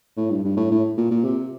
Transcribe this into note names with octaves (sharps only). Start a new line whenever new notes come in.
A2
G2
G2
A2
A2
A#2
A#2
C3